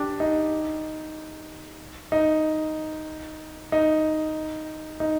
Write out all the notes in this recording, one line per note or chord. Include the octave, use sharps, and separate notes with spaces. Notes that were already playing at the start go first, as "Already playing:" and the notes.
Already playing: D4 G4
D#4
D#4
D#4
D#4